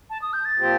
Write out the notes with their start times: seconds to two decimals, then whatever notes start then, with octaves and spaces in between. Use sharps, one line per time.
0.10 A5
0.22 D#6
0.33 G6
0.45 A6
0.57 A#2 F3 C4 G4 C5